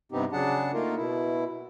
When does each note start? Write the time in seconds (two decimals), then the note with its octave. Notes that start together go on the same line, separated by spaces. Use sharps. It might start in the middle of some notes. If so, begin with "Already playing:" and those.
0.12 G2 C3 B3 C4 D#4 G4
0.32 C#3 F#3 D4 G#4 F#5 A5
0.73 A3 A#3 D#4 F4 A#4
0.96 B2 E4